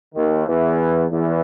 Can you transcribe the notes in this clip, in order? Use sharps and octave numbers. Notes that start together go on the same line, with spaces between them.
D#2 D#3
E2 E3
E2 E3